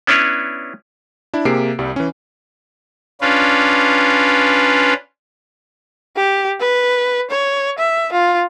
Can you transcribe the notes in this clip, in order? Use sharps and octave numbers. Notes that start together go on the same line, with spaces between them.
B3 C#4 D4 E4 B4 C#5
D4 E4
C3 A#3 G4 G#4 C7 D7
C2 G3
E3 C#4
C#4 D4 F4 B4
G4
B4
C#5
E5
F4